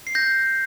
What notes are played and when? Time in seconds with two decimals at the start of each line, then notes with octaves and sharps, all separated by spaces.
0.07 C7
0.15 G6 A#6